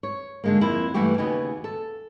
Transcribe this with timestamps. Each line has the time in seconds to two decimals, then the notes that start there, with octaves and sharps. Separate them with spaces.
0.03 C#5
0.44 D3 G#3 A#3
0.61 F2 A#3 E4
0.94 G2 E3 A3 F#4 G4
1.18 D#2 C#3 B3 F#4 D#5 G#5
1.64 A4